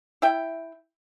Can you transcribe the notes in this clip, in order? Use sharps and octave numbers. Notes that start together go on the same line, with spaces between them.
E4 E5 G5